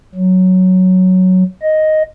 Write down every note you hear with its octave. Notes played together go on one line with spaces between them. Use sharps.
F#3
D#5